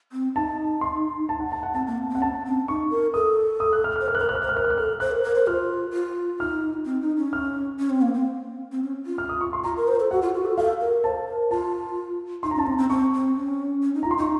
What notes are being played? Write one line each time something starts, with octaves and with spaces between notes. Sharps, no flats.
C4
D#4 A5
C6
A5
F#5
A5
F#5
C4 A5
A#3
C4
C4
F#5
C#4 A5
C4
D#4 C#6
A#4
A4 D#6
D#6
F#6
F6
F6
C5
A#4 F6
F#6
A#4 F6
C5 F#6
F6
C5 F#6
F6
A#4 F#6
F6
F#6
A4 F6
C5 F#6
A#4
A#4
C5
F4 F6
F4
D#4 F6
C4
D#4
C#4
F6
C#4
C4
A#3
C4
C4
C#4
F4
F6
D#6
C#6
C6
F4 A#5
A#4
C5
A4
F#4 F#5
F4
F#4
A4
A4 F5
A#4
C5 A5
A#4
F4 A5
D#4 C6
A#5
C#4
A5
C4 A#5
C4
C4 C#6
C4
C#4
C#4
D#4
F4 A#5
C6
D#4 C#6